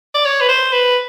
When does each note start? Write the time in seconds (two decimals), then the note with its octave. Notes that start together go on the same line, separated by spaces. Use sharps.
0.15 D5
0.25 C#5
0.41 B4
0.49 C5
0.72 B4